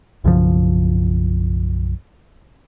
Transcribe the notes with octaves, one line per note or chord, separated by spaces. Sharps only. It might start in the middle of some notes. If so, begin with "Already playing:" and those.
B1 F#2 C#3 F3